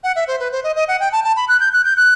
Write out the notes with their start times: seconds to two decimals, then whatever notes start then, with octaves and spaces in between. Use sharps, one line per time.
0.04 F#5
0.16 E5
0.27 C5
0.40 B4
0.52 C5
0.64 D#5
0.76 D#5
0.88 F#5
1.00 G5
1.12 A5
1.24 A5
1.36 B5
1.48 F#6
1.60 G6
1.73 F#6
1.85 G6
1.97 F#6